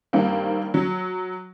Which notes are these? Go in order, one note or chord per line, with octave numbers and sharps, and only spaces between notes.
G2 D#3 G3 A#3 C4
F#3